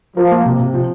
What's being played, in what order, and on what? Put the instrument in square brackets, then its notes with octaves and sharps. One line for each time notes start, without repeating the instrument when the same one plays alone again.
[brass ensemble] F3 [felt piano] A#4
[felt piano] A#3
C3
C3
F3